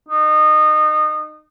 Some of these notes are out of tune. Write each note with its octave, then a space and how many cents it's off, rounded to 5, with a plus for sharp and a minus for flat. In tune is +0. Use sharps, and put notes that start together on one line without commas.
D#4 -25